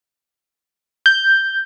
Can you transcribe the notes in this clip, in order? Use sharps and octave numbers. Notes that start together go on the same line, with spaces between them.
G6